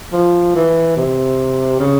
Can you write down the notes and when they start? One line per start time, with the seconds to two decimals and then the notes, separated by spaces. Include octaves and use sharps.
0.13 F3
0.55 E3
0.97 C3
1.80 C#3